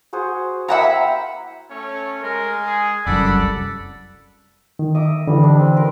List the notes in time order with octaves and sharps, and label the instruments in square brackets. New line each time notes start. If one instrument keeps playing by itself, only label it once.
[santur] F#4 G#4 C5
[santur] A#3 E4 G5 [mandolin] E5 F#5 A#5
[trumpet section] A3 C#4 C#5
[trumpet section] G#3 [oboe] A#4
[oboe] G#4
[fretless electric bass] F1 C2 F#2 [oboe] A4 [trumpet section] D5 F#5 B5
[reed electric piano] D#3
[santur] D#5 E5 D6
[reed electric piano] D3 E3 [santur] G3
[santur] D4 D#4
C4
A#4 B4 C6